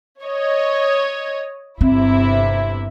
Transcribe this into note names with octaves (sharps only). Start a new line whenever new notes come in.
C#5 D#5
G1 C3 C4 E4